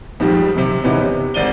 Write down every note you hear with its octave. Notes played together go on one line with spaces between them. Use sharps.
F2 G#2 D#3 F3 G3
F#2 C3
G#2 C3 E3 B3 C#4 D#4
C3
G#1 D5 D#7 G7